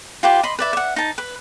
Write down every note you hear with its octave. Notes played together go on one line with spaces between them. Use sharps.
F4 G4 B4 C5
D#5 B5 C6
B4 D5 E5
E5 F#5
D#4 A5
B4